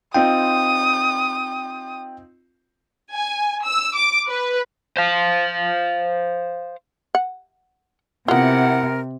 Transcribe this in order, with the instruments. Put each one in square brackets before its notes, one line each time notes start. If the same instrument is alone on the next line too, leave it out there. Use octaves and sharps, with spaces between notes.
[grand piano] C4 D#4 F4 [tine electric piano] G5 [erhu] D#6
[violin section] G#5
E6
D6
B4
[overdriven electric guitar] C5 F5
[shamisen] F#5
[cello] C3 [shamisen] B3 F4 [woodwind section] E4 F#5 [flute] A#4